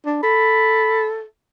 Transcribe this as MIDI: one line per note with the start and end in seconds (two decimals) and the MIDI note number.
0.06 0.19 62
0.23 1.23 69
0.23 1.04 83